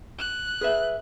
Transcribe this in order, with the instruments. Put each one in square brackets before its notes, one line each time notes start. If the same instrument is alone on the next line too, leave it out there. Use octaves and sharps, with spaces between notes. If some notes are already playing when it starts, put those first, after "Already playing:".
[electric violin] F#6
[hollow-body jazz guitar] G#4 B4 E5